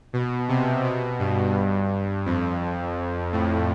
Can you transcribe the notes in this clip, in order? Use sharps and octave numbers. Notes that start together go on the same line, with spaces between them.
B2
C3
B2
G2
F2
A2